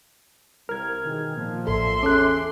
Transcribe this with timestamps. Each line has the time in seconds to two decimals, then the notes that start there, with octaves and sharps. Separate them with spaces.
0.69 C2 A#4 F6 G#6
1.05 B2 D#3 G#4
1.36 A#2 F3
1.67 A1 A4 E5 C6
2.03 E2 C#4 G#4 A4 D6 F#6